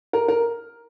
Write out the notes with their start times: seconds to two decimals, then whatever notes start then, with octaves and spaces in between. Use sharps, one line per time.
0.13 A#4
0.28 A#4